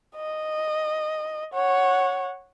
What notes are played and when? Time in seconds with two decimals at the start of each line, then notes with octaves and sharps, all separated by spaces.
0.16 D#5
1.54 C#5 F#5